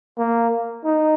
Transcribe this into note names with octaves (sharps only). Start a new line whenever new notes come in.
A#3
D#4